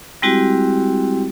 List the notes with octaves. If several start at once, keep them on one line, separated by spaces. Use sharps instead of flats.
G3 G#3 C4 E4 F#4 G4